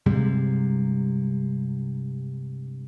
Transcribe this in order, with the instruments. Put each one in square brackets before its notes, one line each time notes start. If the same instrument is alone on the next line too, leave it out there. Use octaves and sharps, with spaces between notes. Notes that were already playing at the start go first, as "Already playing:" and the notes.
[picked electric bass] G2 C3 G3 G#3